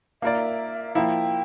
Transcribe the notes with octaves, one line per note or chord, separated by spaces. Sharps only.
A#3 F4 A#4 D5 E5
F3 A#3 E4 G5